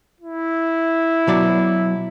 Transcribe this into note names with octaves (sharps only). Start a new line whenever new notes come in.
E4
B2 F#3 D5